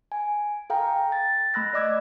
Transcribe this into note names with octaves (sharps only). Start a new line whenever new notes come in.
G#5
A4 F5 G5 A#5
A6
A3 B5 E6 F#6 A#6
D5 D#5 D6 E6 G#6 A#6